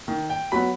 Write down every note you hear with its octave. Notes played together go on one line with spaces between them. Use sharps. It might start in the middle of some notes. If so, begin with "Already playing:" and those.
D#3
G5
F#3 B3 B5